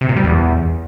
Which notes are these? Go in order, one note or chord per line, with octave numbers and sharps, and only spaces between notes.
C3
A#2
G3
E2